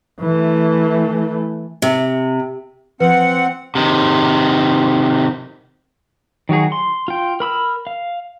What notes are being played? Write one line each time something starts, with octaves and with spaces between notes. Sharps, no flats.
E3 A3
C3
F3 C4 B4 F#5
C3 D#3
D#3 F#3 F#4 G#4
C6
F4 G5
A#4 B5 E6 F6
F5